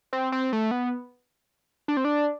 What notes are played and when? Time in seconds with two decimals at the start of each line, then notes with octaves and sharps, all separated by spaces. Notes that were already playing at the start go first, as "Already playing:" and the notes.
0.13 C4
0.32 C4
0.53 A3
0.71 B3
1.88 D4
1.97 C4
2.05 D4